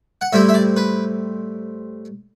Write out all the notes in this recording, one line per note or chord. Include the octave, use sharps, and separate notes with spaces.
F#5
A2 G3 C4 E4 E5
E5
D5
B4